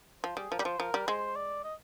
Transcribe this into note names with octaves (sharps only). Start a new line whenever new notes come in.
F3 C5
G3 G#4
F3 A#4
G3
F3 C5
F3 A#4
G3
G#3 C5
D5
D#5